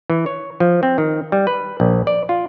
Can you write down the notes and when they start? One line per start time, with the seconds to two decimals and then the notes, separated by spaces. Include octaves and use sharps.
0.10 E3
0.26 C#5
0.60 F3
0.83 C4
0.98 D#3
1.32 G3
1.47 B4
1.80 A#1
2.07 D5
2.29 F4